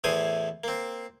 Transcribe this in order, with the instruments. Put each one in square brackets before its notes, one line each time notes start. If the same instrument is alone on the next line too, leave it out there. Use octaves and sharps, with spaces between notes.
[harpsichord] E2 A2 E3 C5 G#5 D#6
A#3 C4